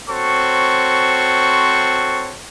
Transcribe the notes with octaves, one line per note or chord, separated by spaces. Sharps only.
C4 F#4 A4 C5 C#5 C#6